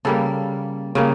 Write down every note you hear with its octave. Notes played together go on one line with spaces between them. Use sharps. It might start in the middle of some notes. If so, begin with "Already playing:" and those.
C#3 G3 A#3 A4
C#3 G3 A#3